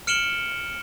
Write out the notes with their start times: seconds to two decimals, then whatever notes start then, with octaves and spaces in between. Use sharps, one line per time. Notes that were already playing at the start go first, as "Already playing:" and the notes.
0.07 F6 C#7 D7 E7 F#7 G7